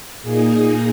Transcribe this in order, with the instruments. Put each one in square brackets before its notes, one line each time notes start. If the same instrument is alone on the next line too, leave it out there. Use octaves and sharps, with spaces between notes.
[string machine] A#2 A#3 D#4 G#4